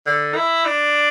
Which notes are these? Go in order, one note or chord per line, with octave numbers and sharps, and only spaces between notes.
D3
E4
D4